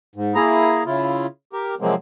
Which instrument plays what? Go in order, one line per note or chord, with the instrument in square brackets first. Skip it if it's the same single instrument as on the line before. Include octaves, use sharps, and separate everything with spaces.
[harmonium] G#2
A#3 E4 G#4 A#5
C#3 E4 F4
G4 A#4
C3 F3 F#3 G#3 A#3 C4